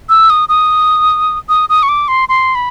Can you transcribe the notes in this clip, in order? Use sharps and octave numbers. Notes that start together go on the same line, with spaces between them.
E6
D#6
D#6
D#6
D#6
C#6
D6
C6
C6
B5